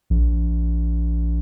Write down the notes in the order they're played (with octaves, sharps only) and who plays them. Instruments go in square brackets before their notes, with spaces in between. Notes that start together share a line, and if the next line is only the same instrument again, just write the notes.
[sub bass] A#1